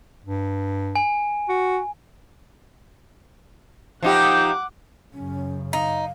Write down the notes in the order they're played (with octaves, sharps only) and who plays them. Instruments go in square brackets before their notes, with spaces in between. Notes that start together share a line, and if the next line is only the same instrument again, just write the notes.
[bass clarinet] G2
[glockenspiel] G#5
[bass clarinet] F#4
[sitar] F3 D#4 G4 [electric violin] F#5 D6
[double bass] F#2 C#3 [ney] C#4
[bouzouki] D#4 [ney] F5